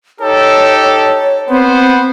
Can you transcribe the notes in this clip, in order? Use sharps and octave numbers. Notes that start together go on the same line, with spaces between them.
D#4 G4 A4 C#5
B3 C4 C5